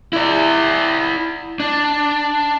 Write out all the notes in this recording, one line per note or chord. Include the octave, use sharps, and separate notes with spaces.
E4 D5
D4